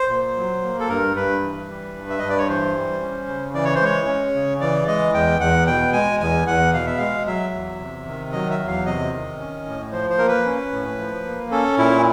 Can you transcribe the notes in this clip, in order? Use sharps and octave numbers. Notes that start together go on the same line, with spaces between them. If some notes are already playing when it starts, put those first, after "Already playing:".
Already playing: C5
A#2
F#3
A#3
A4
G2 A#4
G2 B4
E3
G3
G2
E5
G2 D#5
D5
C#5
E3 C5
G3
C#4
C#3
E3 D5
C#5
C5
G#3 C#5
C#4
C#3
E3 D5
G#3 D#5
E2 G5
E2 F#5
B2 G5
G#3 G#5
E2 G#5
E2 F#5
B2 F5
E5
G#3 F5
F#3 E5
E2
C3
D#3
F#3 D#5
E5
E2
F5
C3 D#5
D#3
C#4
A2
F3 C5
C5
A#3 A#4
B4
C#4
A2
F3
A#3
C#4 A4
A#2 E4